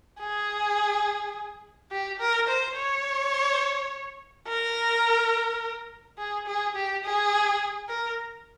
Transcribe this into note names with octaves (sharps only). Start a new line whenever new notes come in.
G#4
G4
A#4
C5
C#5
A#4
G#4
G#4
G4
G#4
A#4